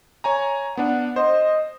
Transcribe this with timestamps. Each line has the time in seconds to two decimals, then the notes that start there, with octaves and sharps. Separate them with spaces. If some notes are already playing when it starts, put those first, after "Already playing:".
0.24 C#5 G#5 A#5
0.77 B3 D4 F#5
1.16 C5 D#5